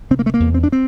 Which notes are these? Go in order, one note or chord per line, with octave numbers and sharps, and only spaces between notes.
C3 C4
A#3
A3
A#3
E2
C4
D4
C4